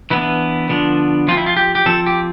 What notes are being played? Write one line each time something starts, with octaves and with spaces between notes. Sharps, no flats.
E3 B3 D4 E4
D3 F3 B3 D4
F3 C4 F4
E4
F4
G4
G4
F3 C4 A4
G4